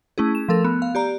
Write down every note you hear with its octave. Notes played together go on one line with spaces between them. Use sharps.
A3 C#4 E4 G#4
E7
F3 A3 A4 A#4
B3
F5
G4 D5 A#5